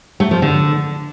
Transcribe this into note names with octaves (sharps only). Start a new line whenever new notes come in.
A3
F3
D3